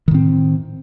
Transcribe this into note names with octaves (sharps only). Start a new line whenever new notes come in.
A2 D#3 C4